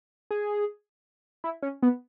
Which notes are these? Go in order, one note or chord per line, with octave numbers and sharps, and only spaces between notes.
G#4
E4
C#4
B3